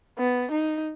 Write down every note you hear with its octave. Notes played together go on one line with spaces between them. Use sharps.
B3
D#4